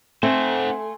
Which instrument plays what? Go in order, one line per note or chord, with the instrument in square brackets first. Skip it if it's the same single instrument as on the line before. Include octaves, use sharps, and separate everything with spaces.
[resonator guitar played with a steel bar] A3 [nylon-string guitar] C4 [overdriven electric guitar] C5 F#5 [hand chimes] G#5 C6